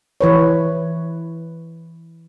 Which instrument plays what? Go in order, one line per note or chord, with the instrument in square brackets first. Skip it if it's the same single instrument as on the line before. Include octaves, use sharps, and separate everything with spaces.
[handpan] E3 B4 C#5